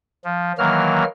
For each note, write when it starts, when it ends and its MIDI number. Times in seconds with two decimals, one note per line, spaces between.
0.25 0.52 53
0.58 1.04 51
0.58 1.04 52
0.58 1.04 54
0.58 1.04 58
0.58 1.04 89